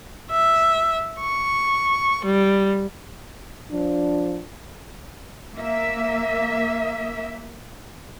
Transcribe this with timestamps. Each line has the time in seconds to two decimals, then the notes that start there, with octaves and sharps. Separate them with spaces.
0.31 E5
1.20 C#6
2.24 G3
3.70 F3 D4
5.55 A#3 E5